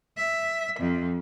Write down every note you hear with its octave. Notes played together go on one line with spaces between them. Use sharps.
E5
F2